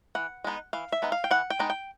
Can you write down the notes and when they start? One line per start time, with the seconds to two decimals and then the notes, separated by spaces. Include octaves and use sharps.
0.15 E3 F#5
0.44 G#3 B3 D#4
0.73 E3 F5
0.92 E5
1.02 G#3 B3 D#4
1.12 F5
1.24 G5
1.31 E3 F#5
1.50 G5
1.59 G#3 B3 D#4
1.70 G5